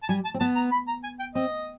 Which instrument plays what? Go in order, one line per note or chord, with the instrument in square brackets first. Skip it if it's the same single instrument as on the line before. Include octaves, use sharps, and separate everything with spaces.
[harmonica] A5
[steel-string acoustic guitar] G3 [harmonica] G#5
[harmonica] A5
[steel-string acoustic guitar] C4
[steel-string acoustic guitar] B3 [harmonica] A5
[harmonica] A#5
B5
A#5
G#5
G5
[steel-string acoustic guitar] C4 [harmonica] D#5